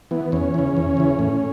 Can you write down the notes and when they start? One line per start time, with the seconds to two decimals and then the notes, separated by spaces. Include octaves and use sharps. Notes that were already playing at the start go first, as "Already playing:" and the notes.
0.11 E3 B3
0.32 E2 C#4
0.54 C#3 E3
0.77 E2
0.97 C#3 E3
1.19 A2